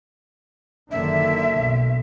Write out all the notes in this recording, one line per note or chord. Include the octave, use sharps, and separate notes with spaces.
F#1 D3 D#3 E5
B1